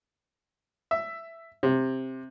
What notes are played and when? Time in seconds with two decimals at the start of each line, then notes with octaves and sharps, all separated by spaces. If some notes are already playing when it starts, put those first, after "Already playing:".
0.91 E5
1.63 C3